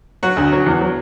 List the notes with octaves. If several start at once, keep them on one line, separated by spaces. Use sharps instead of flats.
F#3 F#4
D2
F#3
E2
F#3